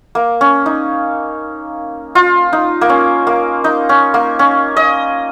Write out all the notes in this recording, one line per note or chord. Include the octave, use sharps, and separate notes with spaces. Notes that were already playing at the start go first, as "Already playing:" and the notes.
A#3
C#4
D#4
F4
D#4
A#3
C#4
A#3
D#4
C#4
A#3
C#4
D#5